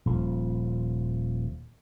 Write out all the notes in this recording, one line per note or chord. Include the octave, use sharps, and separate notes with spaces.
D#1 F3